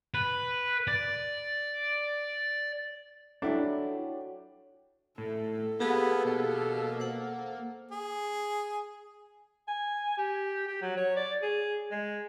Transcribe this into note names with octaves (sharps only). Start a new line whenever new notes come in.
B4
D5
F#3 D4 E4 G4 A4 D5 B5
A2 A4
A#3 B3 G4 G#4 A5
B2
C5 F#5
G#4
G#5
G4
G4
F#3
C#5
D5
G#4
G#3